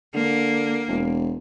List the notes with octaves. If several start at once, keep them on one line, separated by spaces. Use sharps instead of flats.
D3 A#3
E1